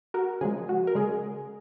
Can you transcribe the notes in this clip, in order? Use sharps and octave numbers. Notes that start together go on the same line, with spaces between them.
F#4 A#4
C#3 F3 G#3 G#4
F#4
A#4
C#3 G#3 G#4